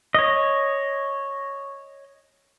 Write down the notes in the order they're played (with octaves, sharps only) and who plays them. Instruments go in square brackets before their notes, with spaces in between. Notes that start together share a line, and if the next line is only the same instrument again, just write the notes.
[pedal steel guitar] C#5 D#5